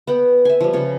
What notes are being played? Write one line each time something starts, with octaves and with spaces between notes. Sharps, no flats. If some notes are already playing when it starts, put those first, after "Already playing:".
B3 F#5 G5
E5 G#5
F3 G3
C#3 F4 C#5